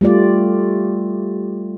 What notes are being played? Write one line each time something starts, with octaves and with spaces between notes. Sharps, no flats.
G3 A3 F4 D5